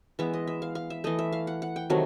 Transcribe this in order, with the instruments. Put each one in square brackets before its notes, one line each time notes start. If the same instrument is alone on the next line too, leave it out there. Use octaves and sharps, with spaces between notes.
[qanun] E3 G#3 B3 E5
D#5
E5
F5
F5
E5
E3 A3 D#5
E5
F5
F#5
F#5
G5
C3 D#3 F#3 A3